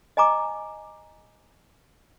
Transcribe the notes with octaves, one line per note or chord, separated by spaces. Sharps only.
D#5 G#5 A#5 D6